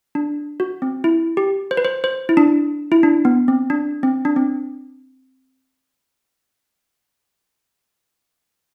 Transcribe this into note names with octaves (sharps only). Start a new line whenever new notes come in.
D4
F#4
C4
E4
G4
C5
B4
C5
C5
E4
D4
E4
D4
B3
C4
D4
C4
D4
C4